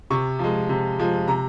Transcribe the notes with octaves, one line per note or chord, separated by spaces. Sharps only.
C3 C#6
F3 G#3
C3
F3 G#3
C3 A#5